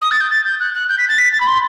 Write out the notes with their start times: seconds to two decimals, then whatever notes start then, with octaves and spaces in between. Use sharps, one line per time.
0.01 D#6
0.11 A6
0.20 G6
0.31 A6
0.45 G6
0.60 F#6
0.74 F#6
0.89 G6
0.98 B6
1.08 A6
1.18 B6
1.32 A6
1.40 B5
1.47 C6